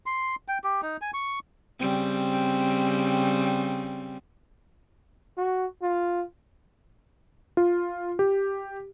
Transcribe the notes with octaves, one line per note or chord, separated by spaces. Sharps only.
C6
G5
G4
D#4
G#5
C#6
C#3 G3 C4
F#4
F4
F4
G4